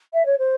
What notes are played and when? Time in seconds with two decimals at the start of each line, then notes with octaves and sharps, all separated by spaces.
0.13 E5
0.26 C#5
0.39 C5